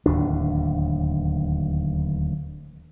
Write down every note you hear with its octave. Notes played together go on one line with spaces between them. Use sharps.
D1 D#2 D4